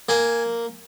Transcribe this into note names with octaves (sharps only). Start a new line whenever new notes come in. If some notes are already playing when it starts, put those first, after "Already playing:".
A#3 G#5